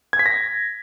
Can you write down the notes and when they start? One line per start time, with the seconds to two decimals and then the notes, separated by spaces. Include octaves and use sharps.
0.13 G#6
0.19 B6
0.26 A#6